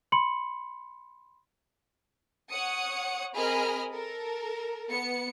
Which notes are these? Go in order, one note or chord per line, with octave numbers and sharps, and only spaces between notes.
B5 C6 C#7 F#7
C#5 F#5 D#6 C#7
C4 G#4 A#4 D#5 B5 F6
A4 A#4
B3 C#7